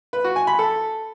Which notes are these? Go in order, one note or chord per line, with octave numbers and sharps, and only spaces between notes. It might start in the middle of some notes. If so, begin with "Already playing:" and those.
B4
F#4
G#5
B5
A4